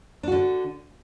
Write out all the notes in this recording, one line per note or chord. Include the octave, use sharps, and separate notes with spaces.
D3 D4 F#4